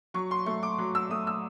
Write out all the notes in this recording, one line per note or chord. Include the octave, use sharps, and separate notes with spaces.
F#3 C#6
C6
A3 C#6
D6
F#3
E6
A3 D#6
E6